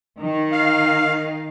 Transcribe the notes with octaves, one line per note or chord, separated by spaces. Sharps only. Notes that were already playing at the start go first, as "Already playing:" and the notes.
D#3
F5